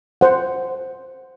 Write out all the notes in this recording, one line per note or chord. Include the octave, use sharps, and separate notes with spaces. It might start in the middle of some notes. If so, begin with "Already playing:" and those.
C5 F#5